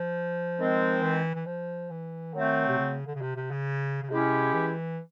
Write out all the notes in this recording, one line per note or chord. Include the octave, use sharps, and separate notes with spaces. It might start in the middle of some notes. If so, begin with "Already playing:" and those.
Already playing: F3
D#3 G#3 C4
E3
E3
F3
E3
D#3 F#3 A3 C4
C3
C#3
D3
C#3
C3
C3
C#3
C#3
C3 G#3 C#4 E4 G4
E3